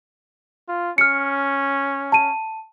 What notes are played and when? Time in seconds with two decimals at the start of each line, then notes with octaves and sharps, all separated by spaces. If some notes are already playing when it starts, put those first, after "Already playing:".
0.68 F4
0.98 C#4 F6 C#7
2.12 A5 D#7